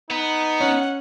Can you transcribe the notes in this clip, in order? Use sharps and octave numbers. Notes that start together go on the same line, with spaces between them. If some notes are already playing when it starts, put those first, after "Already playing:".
B3 D#4
C#4 F#5